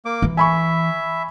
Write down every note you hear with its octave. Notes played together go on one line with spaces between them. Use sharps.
A#3 D6
E3
E5 G#5 B5 C#6